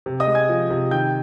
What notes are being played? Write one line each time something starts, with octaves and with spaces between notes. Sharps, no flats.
C3
D#5 D#6
G#3
G#5 G#6
F3
C3
D#3 G5 G6